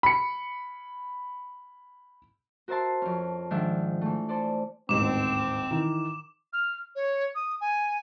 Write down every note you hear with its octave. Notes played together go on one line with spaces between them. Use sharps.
B5 C#7
F#4 A#4 C5 E5 A5 C6
F2 C#4
G#2 D#3 F3 D4 E5
E3 A3
A4 C5 D5
D#1 A1 G#2 C4 D6 E7
D#3 E3
F6
C#5
D#6
G#5